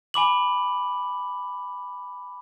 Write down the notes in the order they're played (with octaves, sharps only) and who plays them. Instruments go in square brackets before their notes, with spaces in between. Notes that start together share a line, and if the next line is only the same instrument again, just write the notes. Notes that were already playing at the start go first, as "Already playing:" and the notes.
[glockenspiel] G#5 B5 D6 F#7